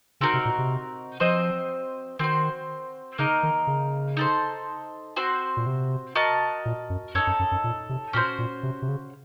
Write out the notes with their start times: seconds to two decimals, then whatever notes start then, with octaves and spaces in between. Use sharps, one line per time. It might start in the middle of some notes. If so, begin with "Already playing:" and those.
0.20 C#3 C4 D#4 F#4 A#4
0.33 C3
0.45 A#2
0.58 C3
1.20 F3 C4 F#4 C5 D#5
2.19 D#3 C4 F#4 C5
3.18 C#3 A#3 D#4 A#4 D#5
3.43 D#3
3.67 C#3
4.17 D#4 A4 C5
5.16 C4 F#4 C5
5.57 A#2
5.66 C3
6.15 F#4 A#4 D#5 A5
6.65 A#2
6.90 F#2
7.15 F#2 D#4 A4 C#5
7.27 F#2
7.39 F#2
7.51 F#2
7.64 A#2
7.89 C3
8.13 A#2 C#4 F#4 A4 C5
8.38 A#2
8.63 C3
8.82 C3
8.88 C#3